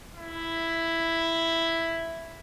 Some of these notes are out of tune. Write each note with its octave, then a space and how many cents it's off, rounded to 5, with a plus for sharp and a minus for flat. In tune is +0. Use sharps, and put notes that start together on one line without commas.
E4 +5